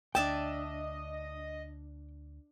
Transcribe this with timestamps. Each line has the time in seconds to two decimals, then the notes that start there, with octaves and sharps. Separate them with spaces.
0.15 D2 D4 D#5 E5 G5 A5